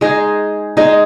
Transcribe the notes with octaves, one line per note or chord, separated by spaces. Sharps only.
G#3 D#4 G#4 D#5
G#3 D#4 G#4 D#5